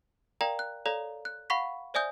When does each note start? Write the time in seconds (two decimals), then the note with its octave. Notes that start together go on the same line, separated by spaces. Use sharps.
0.41 A#4 D5 F5 G5 A#5
0.59 F#6
0.86 A4 C#5 D5 F5 A#5
1.25 F#6
1.50 F5 F#5 B5 C#6 B6
1.94 C5 D5 E5 G#5 D#6 G6